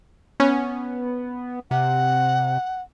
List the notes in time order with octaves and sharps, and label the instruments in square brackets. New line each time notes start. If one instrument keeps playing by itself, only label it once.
[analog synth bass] B3 [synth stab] C#4
[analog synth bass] C3 [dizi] F#5